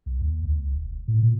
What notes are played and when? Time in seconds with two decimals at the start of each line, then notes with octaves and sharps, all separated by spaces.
0.06 C2
0.21 D#2
0.44 C#2
0.72 E1
1.08 A2
1.22 A#2